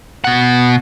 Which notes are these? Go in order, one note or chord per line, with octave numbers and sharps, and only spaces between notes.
B2 F#5